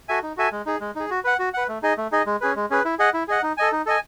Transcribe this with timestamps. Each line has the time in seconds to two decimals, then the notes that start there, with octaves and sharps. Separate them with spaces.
0.08 F#4 A4 E5 G#5
0.23 D#4
0.37 F#4 A4 E5 G#5
0.52 G#3
0.66 D#4 G#4
0.81 G#3
0.95 D#4 G#4
1.10 F#4
1.24 B4 F#5
1.39 F#4
1.54 B4 F#5
1.68 A3
1.83 D#4 G#4 D#5
1.97 A3
2.12 D#4 G#4 D#5
2.26 G#3
2.41 C#4 G#4 B4
2.56 G#3
2.70 C#4 G#4 B4
2.85 E4
2.99 G#4 D#5 F#5
3.14 E4
3.28 G#4 D#5 F#5
3.43 D#4
3.57 A4 D#5 G#5
3.72 D#4
3.86 A4 D#5 G#5